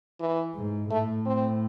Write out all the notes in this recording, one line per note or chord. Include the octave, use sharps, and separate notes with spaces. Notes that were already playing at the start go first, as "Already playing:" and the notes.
E3
G#2
A2 A3
C4